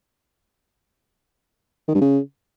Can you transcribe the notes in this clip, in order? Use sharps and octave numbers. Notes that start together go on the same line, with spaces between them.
D#3
G2
C#3